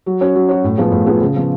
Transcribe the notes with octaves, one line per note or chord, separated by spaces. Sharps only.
F#3
C#4 F#4 C#5
F#3
C#4 F#4 C#5
A2
F3 B3 F4 G#4
A2
F3 B3 F4 G#4
C#3
F3 B3